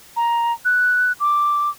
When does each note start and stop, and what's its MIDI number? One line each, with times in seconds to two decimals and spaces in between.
0.16 0.53 82
0.65 1.12 90
1.20 1.70 86